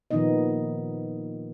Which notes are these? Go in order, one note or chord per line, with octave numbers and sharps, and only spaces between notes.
A#2 D#3 F3 B3 D#4 D#5